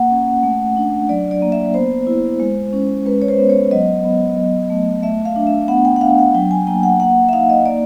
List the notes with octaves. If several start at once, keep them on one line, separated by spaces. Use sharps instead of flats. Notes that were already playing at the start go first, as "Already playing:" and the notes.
Already playing: A#3 F#5
C#4
A3
D4
F#3 D5
D5
A#3
E5
B3 C5
E4
G#3
C#4
G#3 B4
C#5
C5
B3
C#5
F#3 D#5
B3
F#3
A3
A3 E5
F5
D4
E5
B3 F#5
G5
F#5
D4 F5
F#5
F#3 G5
G#5
A#3 G5
F#5
A#3 F#5
E5
D#4 F5
D#5
A#3 D5